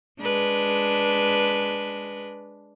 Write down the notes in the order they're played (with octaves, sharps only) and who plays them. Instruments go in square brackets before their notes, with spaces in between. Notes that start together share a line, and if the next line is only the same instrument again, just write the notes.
[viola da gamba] G#3 D4 B4